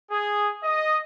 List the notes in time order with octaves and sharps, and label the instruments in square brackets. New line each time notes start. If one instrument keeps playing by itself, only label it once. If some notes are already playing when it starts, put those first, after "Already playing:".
[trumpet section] G#4
D#5